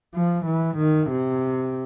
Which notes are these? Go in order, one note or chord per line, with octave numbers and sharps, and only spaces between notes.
F3
E3
D#3
C3